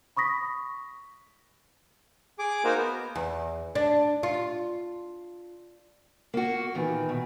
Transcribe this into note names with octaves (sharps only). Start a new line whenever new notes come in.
B5 C#6 D#6 A#6 B6
G#4 D6
A#3 D#4 F#4 A#4 C5
B3
E2
D4
F4
A#3 F#4
A#2 D#3 E3
B2